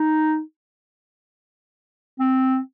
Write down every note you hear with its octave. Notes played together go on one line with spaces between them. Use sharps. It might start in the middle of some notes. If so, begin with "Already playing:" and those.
Already playing: D#4
C4